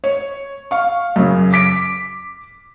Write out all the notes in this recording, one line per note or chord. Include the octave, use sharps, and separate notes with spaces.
C#5
F5 C#6
F#2 C#3
D6 B6 D7